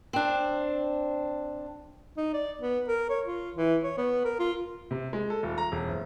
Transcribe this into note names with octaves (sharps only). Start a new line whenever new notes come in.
C4 D4
D#4
D5
B3
A#4
C#5
F4
E3
C#5
B3
A#4
F4
C3
G#3
A4
D#1
A#5
E1
F#1